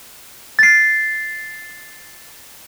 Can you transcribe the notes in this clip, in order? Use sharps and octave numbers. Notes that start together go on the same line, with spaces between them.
A6 C7